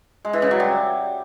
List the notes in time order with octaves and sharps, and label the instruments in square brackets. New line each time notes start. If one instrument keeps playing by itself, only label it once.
[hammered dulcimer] G#3
E3
C#3
F#3
G3